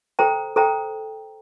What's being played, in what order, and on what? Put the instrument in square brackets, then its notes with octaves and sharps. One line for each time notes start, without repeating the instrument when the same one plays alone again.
[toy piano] A4 C5 G5 A#5
A4 C5 G5 A#5